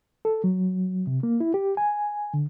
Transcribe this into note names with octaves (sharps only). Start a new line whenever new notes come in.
A4
F#3
C3
A#3
E4
G4
G#5
D3